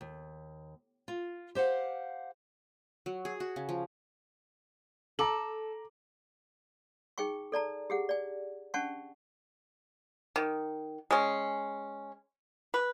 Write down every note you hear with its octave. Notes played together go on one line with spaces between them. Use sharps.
D#2
F4
G4 C5 F5 F#5
F#3
G#4
F#4
C#3
F3
A4 A#5 D6 F#7
D#4 G#4 G5 G#5 C#6
A4 D5 A5 A#5
G4 G#4 F#5
D5 G#5
C#4 D4 F#5 G#5 A5 C#6
D#3
G#3 C#4
B4